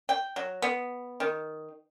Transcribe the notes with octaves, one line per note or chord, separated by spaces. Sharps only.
G5
F#3
B3
D#3